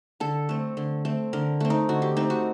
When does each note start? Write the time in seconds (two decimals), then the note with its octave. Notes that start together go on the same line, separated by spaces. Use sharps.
0.20 D3 A4
0.49 A3 C4
0.77 D3
1.05 A3 C4
1.33 D3 A#4
1.60 A3 C4
1.70 D#4
1.89 D3 F#4
2.02 G4
2.17 A3 C4 D#4
2.30 F#4